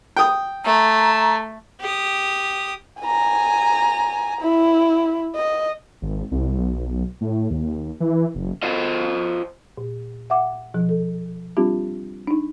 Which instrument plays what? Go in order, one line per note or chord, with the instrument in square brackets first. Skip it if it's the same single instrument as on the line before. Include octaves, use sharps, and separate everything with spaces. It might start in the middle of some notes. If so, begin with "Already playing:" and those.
[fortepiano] G5 D#6
[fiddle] A3 [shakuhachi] A#5
[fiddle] G4 D#6
[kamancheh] G#5 A#5
E4
D#5
[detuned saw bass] G#1
C2
B1
A2
D#2
E3
F#1
[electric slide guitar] F4 C5 D#5
[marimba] A#2
E5 F#5 D6
B2 F3
A4
G3 C4 D4 F4 G4
D4 D#4